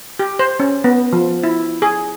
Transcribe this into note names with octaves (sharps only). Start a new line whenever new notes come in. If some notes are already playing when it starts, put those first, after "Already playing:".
G4
C5
C#4
B3
F3
E4
G#4